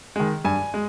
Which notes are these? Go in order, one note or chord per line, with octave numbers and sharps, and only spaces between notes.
D#3 G#3
G2 G#5
G#3